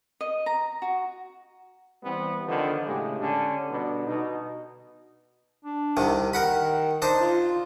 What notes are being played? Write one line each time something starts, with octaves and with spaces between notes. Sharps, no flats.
D#5
A#5
F#4
E3 G3 B3 C4
D3 D#3 F3 B3
A2 C#3 G#3 G4
D3 C#4 D4
B2 D3 G3 B3 D4
B2 D#4
D4
C2 C3 D#3
D#3 A#4 F#5 B5
D4 D#4 C5
F4